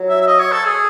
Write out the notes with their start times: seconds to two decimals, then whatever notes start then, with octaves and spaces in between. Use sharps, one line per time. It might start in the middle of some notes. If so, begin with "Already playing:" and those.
Already playing: F#3
0.09 E5
0.21 E5
0.27 D#5
0.39 C#5
0.52 A4
0.65 G#4